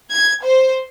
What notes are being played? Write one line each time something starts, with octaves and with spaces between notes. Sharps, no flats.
G#6
C5